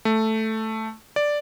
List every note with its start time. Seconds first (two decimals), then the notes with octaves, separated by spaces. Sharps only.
0.05 A3
1.16 D5